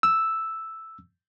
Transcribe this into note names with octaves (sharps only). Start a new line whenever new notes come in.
E6